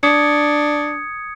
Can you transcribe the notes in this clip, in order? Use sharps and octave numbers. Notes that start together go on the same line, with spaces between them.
D4 D#6 G#6 C#7